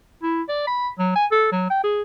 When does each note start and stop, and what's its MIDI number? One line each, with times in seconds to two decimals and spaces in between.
0.23 0.42 64
0.49 0.65 74
0.67 0.89 83
0.99 1.11 54
1.16 1.26 80
1.32 1.49 69
1.52 1.67 54
1.70 1.83 79
1.84 2.02 68